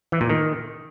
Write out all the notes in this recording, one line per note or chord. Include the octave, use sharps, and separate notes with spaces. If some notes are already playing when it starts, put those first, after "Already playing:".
E3
A#2
D#3